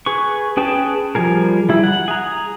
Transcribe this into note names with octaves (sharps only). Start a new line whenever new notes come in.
G#4 B4 C#6
C#4 G#4 B4 G5 A5
F3 G3 G#4 A#4
G3 E4
F#5
G#4 A#5